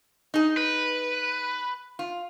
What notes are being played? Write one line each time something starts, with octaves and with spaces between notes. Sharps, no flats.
D#4 G#4
B4
F4